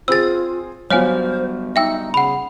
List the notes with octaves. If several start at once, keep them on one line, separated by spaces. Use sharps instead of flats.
C4 F4 G#4 E6 A6
F#3 G3 B3 C5 C#5 F5 G#5 F6
D#4 E5 G5 E6
C#3 F#5 B5